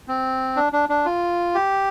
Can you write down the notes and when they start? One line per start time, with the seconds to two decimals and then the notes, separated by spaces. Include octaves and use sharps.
0.08 C4
0.56 D4
0.73 D4
0.89 D4
1.05 F4
1.55 G4